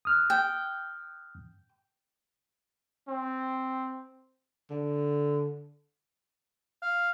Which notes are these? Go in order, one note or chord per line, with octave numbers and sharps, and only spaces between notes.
D#6 F6 F#6
G5
C4
D3
F5